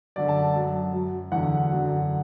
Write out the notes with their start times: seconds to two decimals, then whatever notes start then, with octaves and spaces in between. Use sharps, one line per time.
0.16 F#2 D3 F#3 D5
0.28 A5
0.55 F#2 F#3
0.93 F#2 F#3
1.32 E2 D3 F#3 F#5
1.71 F#2 D3 F#3